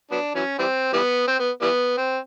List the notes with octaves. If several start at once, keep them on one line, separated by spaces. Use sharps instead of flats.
F#3 B3 D4
E3 F#3 C#4
E3 G3 C4
E3 G3 B3
C4
B3
E3 G3 B3
C4